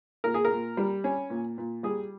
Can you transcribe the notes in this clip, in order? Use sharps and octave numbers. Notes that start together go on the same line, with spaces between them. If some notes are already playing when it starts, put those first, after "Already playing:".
A#2 A#4
G#4
A#4
A#2
G3
C#4
A#2
A#2
G3 G#4